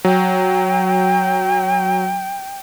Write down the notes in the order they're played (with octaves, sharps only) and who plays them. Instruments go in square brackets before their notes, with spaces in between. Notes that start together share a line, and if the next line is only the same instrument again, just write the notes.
[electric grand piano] F#3 [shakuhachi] G5